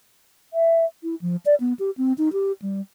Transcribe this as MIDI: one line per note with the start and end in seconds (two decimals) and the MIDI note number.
0.54 0.85 76
1.03 1.15 64
1.21 1.36 53
1.46 1.55 74
1.60 1.73 59
1.79 1.91 67
1.98 2.13 60
2.18 2.29 63
2.33 2.52 67
2.62 2.81 55